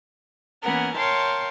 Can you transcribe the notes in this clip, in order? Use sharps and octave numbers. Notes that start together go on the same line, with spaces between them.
E3 A#3 B3 C#4 A#4 F#5
A#4 C#5 F5 G5 A5 C6